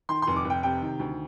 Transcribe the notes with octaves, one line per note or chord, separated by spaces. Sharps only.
D#3 C6
C6
F1
D6
F1
G5
C3 G5
D#3
D2